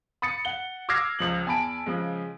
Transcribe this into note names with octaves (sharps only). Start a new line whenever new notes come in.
B5 D#6 A6 C#7
F#5 G7
D6 E6 F6 G#6 A#6 C7
C#2 F3 F#7
E2 G#5 A5 B5 D7
C#3 F3 G#3